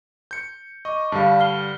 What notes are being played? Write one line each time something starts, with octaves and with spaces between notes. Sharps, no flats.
G6 C#7
D#5 C#6 D6
G2 D3 G3 F5 A5
F6 C7 G7